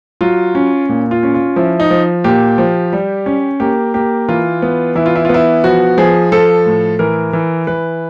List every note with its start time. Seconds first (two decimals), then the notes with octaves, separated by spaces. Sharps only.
0.21 F#3 F4
0.55 C#4
0.89 A#2
1.11 F4
1.23 C#4
1.34 F4
1.56 F3 E4
1.80 D#4
1.91 F3
2.24 A#2 G4
2.58 F3
2.93 G3
3.26 C#4
3.60 A#3 G4
3.94 A#3 G4
4.29 E3 F4
4.62 B3
4.95 E3 E4
5.06 F4
5.16 E4
5.25 B3 F4
5.34 E4
5.64 F3 F#4
5.98 F3 G#4
6.32 F3 A4
6.66 A2
6.99 E3 A#4
7.33 E3
7.67 E3 B4